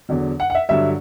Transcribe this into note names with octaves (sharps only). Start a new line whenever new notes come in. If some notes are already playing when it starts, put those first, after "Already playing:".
E2 D3 F#3
F#5
F#5
E5
G2 D3 F#3 E5